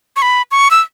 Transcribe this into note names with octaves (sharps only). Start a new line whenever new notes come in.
C#6
B5
C#6
E6